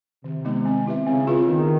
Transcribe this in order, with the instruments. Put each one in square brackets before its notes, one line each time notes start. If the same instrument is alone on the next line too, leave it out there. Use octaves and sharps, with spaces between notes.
[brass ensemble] C3 [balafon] D#3
[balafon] G#3 B3 D#4
C4
E4 G4 B4 E5
[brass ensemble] C#3 [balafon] C4
[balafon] F4 G#4 B4
[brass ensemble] D#3 [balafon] B3